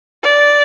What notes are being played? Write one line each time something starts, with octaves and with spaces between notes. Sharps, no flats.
D5